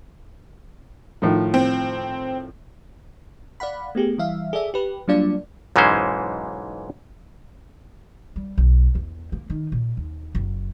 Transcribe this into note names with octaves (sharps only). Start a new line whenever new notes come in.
A2 D#3 F3
C4
D5 F5 F#5 B5
A3 B3 G4 G#4
E3 G3 E5 F5
G#4 A4 D5 E5
G4 B4
F#3 G3 A#3 D4 F4 D5
B1 G#2 E3 G#3 C#4 C5
G3
B1
E2
A#3
D#3
A#2
D#2
F#1